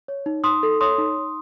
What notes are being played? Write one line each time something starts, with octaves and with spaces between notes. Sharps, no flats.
C#5
D#4
D#4 C6 D#6
A4
C#5 C6 D#6
D#4
D#4